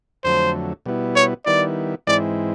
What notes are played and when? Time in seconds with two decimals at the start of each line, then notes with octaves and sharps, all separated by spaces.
0.24 F2 D3 F#3 A3 C5
0.86 B2 G3 B3 E4
1.16 C#5
1.46 D#3 G3 B3 E4 D5
2.07 G#2 E3 G#3 C4 E4 D5